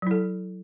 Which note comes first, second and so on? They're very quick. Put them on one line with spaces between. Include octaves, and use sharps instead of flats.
F#3 E4 A4